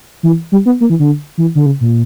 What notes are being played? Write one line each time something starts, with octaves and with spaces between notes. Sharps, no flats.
E3
G3
B3
A#3
E3
D3
E3
D3
C#3
A#2